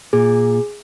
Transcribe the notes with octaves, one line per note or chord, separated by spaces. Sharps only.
A#2 G#4